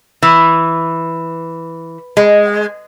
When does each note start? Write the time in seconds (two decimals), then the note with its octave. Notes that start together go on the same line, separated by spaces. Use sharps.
0.23 E3
2.17 G#3